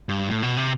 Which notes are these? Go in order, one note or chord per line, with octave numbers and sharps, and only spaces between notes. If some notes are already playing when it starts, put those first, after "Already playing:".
G2
A2
B2
C3